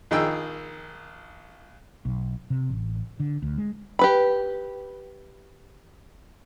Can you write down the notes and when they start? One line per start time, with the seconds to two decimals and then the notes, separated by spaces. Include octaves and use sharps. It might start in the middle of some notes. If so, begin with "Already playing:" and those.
0.11 A#1 D#3 G#4 D#5 G5 E6
2.05 B1
2.50 C3
2.70 A1
3.20 D3
3.42 D2
3.58 G#3
3.99 G4 B4 B5